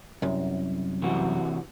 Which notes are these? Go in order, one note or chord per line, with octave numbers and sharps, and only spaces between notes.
C2 F#2
C3 E3 F#4